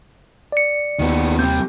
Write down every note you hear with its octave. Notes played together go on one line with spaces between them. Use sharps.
D5 C#7
D#2 D#3 B3
C3 G3 G6